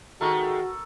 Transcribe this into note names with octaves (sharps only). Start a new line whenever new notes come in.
D#3 G#3 A3 F#4 A4 A#4 C#6